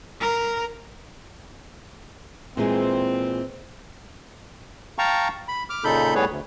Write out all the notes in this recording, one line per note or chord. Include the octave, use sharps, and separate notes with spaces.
A#4
A#2 E3 G#3 C4
F5 G5 A5 A#5 C#6
B5
D6 F6
A#2 C#3 D#4 A4 B5 G6
A2 G3 B3 G#4 B4 C#5
D2